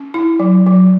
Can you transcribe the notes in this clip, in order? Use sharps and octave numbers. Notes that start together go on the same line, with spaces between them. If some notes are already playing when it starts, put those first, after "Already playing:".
Already playing: C#4
E4
F#3
F#3